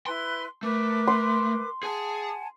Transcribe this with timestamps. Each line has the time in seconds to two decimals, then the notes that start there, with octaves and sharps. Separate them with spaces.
0.06 E4 B4 C6 F#6
0.63 A3 A#4 B4 D6
1.07 C6
1.83 G#4 F#5 G#5 A5